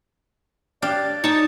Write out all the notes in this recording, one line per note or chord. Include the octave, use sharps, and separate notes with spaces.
D4 G4 D5 F5
D#4 C#5 A5